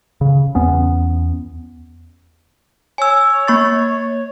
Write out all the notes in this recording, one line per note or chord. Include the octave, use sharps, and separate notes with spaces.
C#3
E2 B3 C#4
C#5 G#5 E6
A#3 C#6 A6